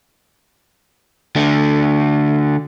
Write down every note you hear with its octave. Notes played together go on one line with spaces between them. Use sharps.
D3 A3